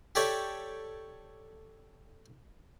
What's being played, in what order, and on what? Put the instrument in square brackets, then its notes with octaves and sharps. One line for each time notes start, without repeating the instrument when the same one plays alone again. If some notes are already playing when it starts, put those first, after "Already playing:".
[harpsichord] G4 A4 C#5 D5 E5 G5